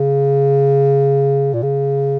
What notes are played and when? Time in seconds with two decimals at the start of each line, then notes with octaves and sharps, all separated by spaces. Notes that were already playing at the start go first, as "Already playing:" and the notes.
Already playing: C#3
1.53 A#2
1.62 C#3